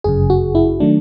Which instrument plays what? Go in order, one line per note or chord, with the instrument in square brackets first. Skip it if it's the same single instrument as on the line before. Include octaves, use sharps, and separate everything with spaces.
[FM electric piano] G1 F#2 C#3 G#4
F#4
E4
D#3 F#3 A3 D4